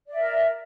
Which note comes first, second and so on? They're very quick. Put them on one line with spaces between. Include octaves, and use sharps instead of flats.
D5 E5 A#4